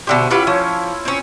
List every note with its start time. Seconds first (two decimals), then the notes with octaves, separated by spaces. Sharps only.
0.07 B2 D3 G4 C5 E5
0.30 C#4 E4 F4 G4 B4 F#5
0.47 F3 C#5 G#5
1.05 C4 C#4